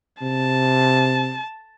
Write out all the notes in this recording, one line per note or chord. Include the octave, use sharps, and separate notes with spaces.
C3 A5